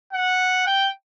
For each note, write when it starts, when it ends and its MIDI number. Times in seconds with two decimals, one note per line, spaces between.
0.13 0.66 78
0.67 0.89 79